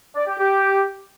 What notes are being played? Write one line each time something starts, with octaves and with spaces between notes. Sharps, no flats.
D5
G4
G4